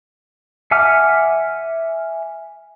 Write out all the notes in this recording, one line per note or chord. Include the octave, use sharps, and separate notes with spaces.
E5 F#5 G#5 D6 F6